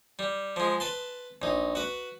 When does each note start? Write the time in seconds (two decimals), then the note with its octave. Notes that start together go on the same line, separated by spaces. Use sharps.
0.19 G3
0.56 F3 G#3
0.80 B4 A5 C6
1.42 A#1 D#4
1.75 F#4 B4